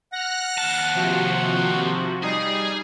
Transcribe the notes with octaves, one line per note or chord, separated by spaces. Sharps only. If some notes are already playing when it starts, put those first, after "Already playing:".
F#5 F6 F#6 A#6
D#2 A5
C3 F3 F#4
G3 D#4 G#4